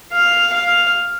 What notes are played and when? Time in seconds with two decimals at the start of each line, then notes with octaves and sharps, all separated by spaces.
0.13 F5
0.53 F5